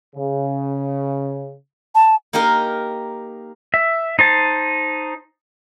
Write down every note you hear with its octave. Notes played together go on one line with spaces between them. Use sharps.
C#3
A5
A#3 D#4 G4 A#4 D#5
E5
D#4 C5 A5